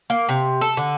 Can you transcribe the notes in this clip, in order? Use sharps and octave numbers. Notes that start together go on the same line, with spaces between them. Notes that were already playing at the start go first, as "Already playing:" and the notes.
A#3
C3
A4
D3